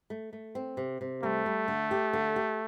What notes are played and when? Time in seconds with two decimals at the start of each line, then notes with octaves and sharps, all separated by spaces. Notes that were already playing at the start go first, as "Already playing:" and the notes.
0.10 A3
0.33 A3
0.55 C4
0.77 C3
1.01 C3
1.23 G3 A3
1.46 G3
1.68 D3
1.91 G4
2.13 D3
2.36 G4